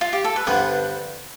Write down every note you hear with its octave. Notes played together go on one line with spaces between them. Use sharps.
F4
G4
A4
B4
G2 D3 G3 B3 D4 C5